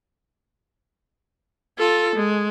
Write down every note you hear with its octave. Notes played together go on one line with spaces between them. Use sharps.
F4 A4
G#3